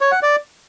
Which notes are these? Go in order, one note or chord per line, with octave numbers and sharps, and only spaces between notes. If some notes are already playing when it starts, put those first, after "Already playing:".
C#5
F#5
D5